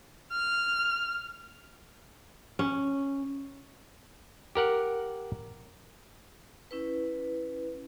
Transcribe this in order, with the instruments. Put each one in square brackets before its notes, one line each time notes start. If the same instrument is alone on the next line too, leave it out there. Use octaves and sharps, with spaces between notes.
[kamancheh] F6
[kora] C#4
[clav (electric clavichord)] G4 A#4 F#5
[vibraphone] C#4 E4 B4